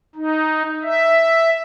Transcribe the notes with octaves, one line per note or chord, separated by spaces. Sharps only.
D#4
E5